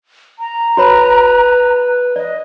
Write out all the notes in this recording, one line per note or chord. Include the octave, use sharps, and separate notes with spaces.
A#5
F#4 B4 C#5 B5
D5 D#5